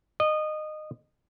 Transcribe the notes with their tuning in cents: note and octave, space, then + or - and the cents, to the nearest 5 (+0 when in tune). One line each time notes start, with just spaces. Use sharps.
D#5 -20